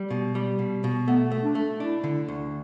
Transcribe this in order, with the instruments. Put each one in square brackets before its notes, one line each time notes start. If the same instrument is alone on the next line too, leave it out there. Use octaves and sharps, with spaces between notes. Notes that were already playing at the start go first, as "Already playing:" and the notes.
Already playing: [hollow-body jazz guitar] G3
B2
G3
B2
B2
[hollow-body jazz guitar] A3 [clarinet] B3
[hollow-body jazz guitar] A3
[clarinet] D4
[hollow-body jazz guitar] A3
[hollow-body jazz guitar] D4 [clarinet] E4
[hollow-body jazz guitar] D3
D2